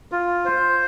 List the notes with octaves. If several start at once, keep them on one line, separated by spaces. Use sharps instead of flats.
F4
C5